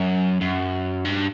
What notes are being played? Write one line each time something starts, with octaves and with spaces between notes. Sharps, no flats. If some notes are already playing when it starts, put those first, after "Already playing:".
Already playing: F#2
F#2
G2